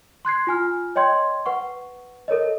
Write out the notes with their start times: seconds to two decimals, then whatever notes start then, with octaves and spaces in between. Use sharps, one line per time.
0.25 C6 F#6 G#6 C7
0.47 F4 G#5 F6
0.96 C#5 D#5 G5 C6 G#6
1.46 B4 F#5 C#6
2.28 A4 A#4 C#5 D#5